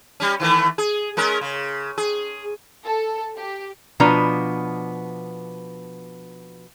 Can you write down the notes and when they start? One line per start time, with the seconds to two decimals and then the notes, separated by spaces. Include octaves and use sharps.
0.20 G3 C#4
0.40 D#3 E3 A3
0.78 G#4
1.17 G#3 C#4 A#4
1.41 C#3
1.98 G#4
2.84 A4
3.38 G4
4.00 B2 F3 B3 D4 A#5